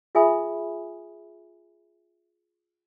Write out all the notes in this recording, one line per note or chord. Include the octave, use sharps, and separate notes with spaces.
F4 G#4 E5 G#5 B5 D#6